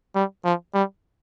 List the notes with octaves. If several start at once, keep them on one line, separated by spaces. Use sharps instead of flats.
G3
F3
G3